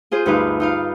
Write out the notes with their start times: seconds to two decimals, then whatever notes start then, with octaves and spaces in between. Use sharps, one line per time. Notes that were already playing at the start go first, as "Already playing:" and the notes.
0.11 F4 G#4 C5
0.26 D2 G2 D#4 G#4 B4 F5
0.60 D#4 F4 F5